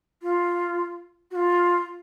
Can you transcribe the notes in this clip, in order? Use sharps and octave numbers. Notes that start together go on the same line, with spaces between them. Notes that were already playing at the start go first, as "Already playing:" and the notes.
F4
F#4
F4